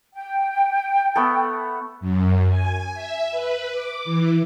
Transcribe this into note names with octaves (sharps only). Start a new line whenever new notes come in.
G5
A3 B3 A4
F#2
G#5
E5
B4
D6
E3